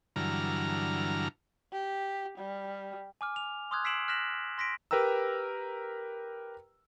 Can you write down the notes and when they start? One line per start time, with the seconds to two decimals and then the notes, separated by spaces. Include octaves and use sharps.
0.16 G2 D3 E3 F#3 A#5 F6
1.73 G4
2.38 G3
3.21 G#5 D6 F6
3.36 F7
3.71 C6 D6 D#6 F6 F#6 G#6
3.84 E6 B6 C7 D7 E7 F#7
4.08 F6 F#6 A#6 B6 E7 F#7
4.58 C6 A#6 B6 D7
4.91 G4 A#4 B4 G5 A#5 E6